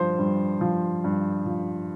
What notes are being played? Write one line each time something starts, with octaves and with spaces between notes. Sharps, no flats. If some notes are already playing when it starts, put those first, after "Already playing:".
Already playing: G2 F3 C5
G2
F3
G2
F3